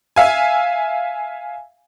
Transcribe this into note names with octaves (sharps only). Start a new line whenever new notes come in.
E5 F5 G#5